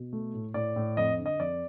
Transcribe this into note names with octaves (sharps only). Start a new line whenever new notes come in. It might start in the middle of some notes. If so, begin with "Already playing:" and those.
Already playing: B2
A3
A2
A2 D5
A2
F2 D#5
D3
D#5
F2 D5